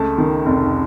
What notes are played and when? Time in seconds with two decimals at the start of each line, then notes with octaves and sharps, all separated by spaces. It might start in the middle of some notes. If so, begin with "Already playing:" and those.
Already playing: C#2 A3 A5
0.18 D#3
0.46 F1